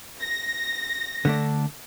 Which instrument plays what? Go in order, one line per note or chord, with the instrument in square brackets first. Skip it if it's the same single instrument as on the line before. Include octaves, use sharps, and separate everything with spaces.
[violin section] A#6
[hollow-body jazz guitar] D3 A3 D4